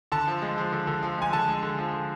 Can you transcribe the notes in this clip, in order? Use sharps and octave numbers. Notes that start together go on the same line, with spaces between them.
D3 A5
F3
G#3
F3
D3
D3
F3
G#3 G#5
D3 A5
G#3
D3
F3
D3